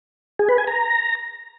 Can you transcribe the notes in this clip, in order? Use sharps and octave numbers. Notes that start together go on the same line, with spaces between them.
G#4
B4
G#5
A#5